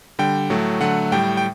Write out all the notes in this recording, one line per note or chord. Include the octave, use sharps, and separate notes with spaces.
D3 G3 G5
A2 F#3 A3
D3 F#3 A3 F#5
A2 G3 G5
G5